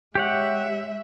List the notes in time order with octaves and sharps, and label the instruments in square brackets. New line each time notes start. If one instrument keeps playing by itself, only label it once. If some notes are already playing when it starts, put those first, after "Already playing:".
[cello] G#3 E5 [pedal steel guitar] G4 C#5 F#5